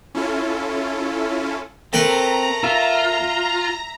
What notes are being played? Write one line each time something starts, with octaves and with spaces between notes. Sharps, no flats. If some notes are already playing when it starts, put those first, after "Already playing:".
C#4 E4 F4 A4
A3 C4 A#4 B4 A#5
F4 E5